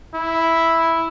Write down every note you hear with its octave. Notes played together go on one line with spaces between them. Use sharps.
E4